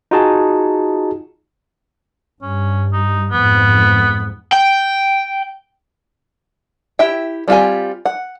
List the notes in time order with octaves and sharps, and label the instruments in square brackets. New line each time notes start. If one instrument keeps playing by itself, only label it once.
[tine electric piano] D#4 F4 F#4 G#4 A5
[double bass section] G2 [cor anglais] C#4
[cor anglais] D#4
[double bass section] F2 G#2 [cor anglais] B3
[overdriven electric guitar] G5
[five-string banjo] E4 G4 E5 G5
G3 C4 F4 G4 G#5
F#5